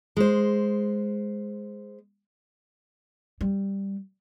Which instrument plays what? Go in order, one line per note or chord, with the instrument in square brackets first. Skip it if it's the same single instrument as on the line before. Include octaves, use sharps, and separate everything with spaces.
[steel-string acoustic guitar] G#3 C5
[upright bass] G3